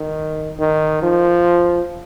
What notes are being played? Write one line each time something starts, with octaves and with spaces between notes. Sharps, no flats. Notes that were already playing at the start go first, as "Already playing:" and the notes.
Already playing: D#3
D#3
F3